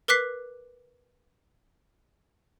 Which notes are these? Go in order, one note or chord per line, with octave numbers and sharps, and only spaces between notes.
A#4 B4 D6 F#6 B6 C7